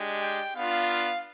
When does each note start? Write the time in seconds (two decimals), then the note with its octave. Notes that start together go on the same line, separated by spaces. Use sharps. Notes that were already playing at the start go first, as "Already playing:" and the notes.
Already playing: G#3 D4 G4
0.21 G5
0.55 B3 D4 F4 F5